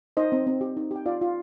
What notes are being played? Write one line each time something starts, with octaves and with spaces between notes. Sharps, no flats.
D#4 C5 D#5
C4
C4
G4
D#4
G4 G5
F4 D5 F5
F4